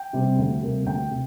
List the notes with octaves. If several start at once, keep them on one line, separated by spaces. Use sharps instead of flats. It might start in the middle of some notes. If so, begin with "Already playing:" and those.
Already playing: G5
C3 G3 C4
D2
C3 G3 A#3
D2 G5
C3